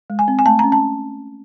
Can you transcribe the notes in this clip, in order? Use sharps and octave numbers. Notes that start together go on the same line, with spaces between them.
G#3
G#5
C4
G#5
A3 A5
A#5
C#4
A5